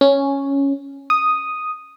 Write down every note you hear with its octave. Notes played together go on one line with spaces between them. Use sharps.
C#4
D#6